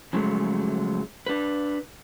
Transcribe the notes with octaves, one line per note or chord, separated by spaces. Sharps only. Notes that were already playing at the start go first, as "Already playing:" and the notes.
C#3 F3 F#3 G#3 A3
D4 B4